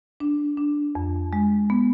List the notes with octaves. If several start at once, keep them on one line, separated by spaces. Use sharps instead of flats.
D4
D4
F2
G#3
B3